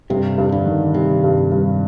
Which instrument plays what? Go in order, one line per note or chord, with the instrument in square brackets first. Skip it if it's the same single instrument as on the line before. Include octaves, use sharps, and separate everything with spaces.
[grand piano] G2 [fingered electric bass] C3
[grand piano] G2
[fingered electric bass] D3
[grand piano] D#3
[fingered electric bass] C3 [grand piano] G3
[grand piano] G2
G2